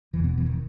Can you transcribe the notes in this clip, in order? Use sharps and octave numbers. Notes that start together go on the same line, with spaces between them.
E1 E2 B2 E3
B3
E3
D#3